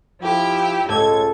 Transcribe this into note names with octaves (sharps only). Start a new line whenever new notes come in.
F3 E4 G4
C#2 A2 A4 G#6